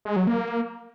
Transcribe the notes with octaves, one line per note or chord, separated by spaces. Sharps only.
G#3
F#3
A#3